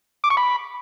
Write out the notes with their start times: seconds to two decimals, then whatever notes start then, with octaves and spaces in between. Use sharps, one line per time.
0.24 D6
0.30 C#6
0.37 B5